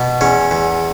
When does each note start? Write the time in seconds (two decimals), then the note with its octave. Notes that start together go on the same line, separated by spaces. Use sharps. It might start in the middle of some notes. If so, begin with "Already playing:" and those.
Already playing: B2
0.21 E2 C#4
0.51 E2